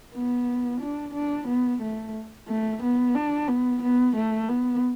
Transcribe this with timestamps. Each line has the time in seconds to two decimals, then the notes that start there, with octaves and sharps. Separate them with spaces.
0.14 B3
0.80 D4
1.14 D4
1.48 B3
1.82 A3
2.48 A3
2.82 B3
3.15 D4
3.48 B3
3.82 B3
4.16 A3
4.49 B3